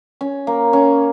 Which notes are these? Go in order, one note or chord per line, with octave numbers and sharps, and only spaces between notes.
C#4
A#3
C#4